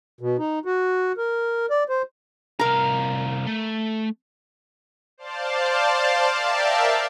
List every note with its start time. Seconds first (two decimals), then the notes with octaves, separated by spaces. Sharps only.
0.21 B2
0.39 D#4
0.65 F#4
1.18 A#4
1.70 D5
1.89 C5
2.59 C2 A#4 F5 A#5
3.47 A3
5.18 C5 D5 F5 A5
6.37 A#4 D5 E5 F5 G5 A5